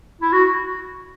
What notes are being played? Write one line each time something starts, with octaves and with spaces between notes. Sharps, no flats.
E4
F#4